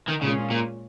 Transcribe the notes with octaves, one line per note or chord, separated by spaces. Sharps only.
D#3
A#2 C#3 G#3 C#4 F4 G#4
A#2